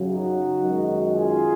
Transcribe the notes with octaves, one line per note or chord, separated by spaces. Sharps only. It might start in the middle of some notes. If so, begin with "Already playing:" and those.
Already playing: F#2 C#3 F#3
D#4 F#4
F#2 D#3 G#3
F4 G#4